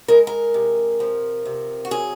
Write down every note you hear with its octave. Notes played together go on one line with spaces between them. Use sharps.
G#3 A#4
A#4
C3
F3
C3
F#4
F#3 G#4